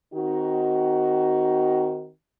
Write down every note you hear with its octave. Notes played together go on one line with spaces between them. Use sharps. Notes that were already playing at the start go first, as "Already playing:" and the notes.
D#3 C4 D#4 F#4